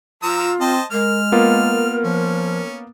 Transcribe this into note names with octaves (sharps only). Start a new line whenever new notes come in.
F3 F4 A#5 E6
C4 C5 D#5 A5
G#3 A#4 F6
A#3 B3 F4 A#4
F3 C#4